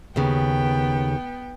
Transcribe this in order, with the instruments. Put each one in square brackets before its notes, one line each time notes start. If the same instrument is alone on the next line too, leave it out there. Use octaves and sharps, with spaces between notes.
[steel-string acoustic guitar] D#2 C#3 [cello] B3 G5